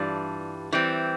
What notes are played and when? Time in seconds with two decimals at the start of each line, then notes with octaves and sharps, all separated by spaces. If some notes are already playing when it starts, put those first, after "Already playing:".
Already playing: G2 E3 G3 D4 F4
0.72 E3 G3 C4